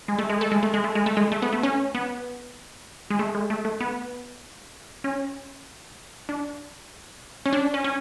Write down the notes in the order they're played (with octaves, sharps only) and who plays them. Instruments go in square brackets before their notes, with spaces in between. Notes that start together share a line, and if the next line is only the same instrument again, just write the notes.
[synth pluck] G#3
A3
G#3
A3
G#3
A3
G#3
A3
G#3
A3
G#3
A3
B3
A3
C#4
B3
G#3
A3
G#3
A3
A3
B3
C#4
D4
C#4
D4
C#4
C#4